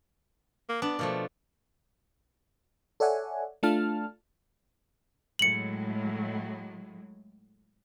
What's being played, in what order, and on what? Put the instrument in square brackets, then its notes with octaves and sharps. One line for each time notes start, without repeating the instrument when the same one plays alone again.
[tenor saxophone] A#3
[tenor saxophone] B3 [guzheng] D4
[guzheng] B2 F3 A3 [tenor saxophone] A#3
[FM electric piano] A4 C#5 D5 E5 F#5 G#5
A3 D4 F4 A5 F6
[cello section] A2 F#3 G#3 [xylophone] C#7 F#7